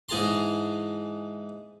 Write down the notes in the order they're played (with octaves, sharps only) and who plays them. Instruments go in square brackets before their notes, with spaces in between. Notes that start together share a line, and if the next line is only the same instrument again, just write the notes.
[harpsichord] G#2 E3 G#4 A5 A#5 C6